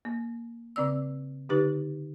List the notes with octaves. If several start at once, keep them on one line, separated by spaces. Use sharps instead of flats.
A#3
C#3 C4 D5 E6
D3 D#4 G4 B4